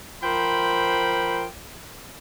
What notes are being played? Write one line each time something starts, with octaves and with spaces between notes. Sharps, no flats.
F3 A#4 C5 G5 B5